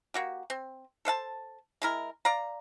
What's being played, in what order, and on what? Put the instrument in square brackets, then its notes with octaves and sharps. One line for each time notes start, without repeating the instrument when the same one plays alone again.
[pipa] A#3 F#4 G4
C4
A4 C5 F5 A5
G#3 E4 A#4
D5 F5 A#5